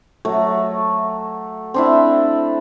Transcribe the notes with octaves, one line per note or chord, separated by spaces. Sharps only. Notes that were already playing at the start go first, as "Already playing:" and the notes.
F#3 A3
C4 D4 E4